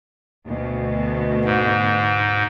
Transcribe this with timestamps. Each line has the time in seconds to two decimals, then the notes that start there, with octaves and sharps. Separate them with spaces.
0.45 D2 B2
1.45 G#2